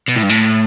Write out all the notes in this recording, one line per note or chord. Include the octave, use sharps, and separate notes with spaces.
B2
A2
G2
A2